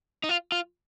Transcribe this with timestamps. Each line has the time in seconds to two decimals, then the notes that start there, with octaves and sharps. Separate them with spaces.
0.24 D#4
0.29 F4
0.52 F4